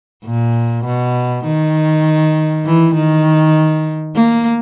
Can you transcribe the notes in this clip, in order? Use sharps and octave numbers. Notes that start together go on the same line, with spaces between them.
A#2
B2
D#3
E3
D#3
A#3